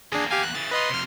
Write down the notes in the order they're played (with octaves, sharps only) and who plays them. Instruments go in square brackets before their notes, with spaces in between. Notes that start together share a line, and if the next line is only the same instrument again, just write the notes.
[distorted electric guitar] E2 A#3 [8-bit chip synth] D4 G#4
[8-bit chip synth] G4 F5 G#5
F#6
[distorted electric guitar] C#3 E3 [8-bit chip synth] A6
[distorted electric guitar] D#4 F4 [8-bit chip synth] B4 D#5 C6
[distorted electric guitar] F2 C3 [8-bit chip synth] C6 F6